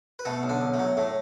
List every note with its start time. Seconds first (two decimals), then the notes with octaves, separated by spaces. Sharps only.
0.19 B4
0.25 B2 A3 A4
0.43 B1
0.49 D3 D4
0.61 B1
0.74 A3
0.79 F#3
0.97 A2 A3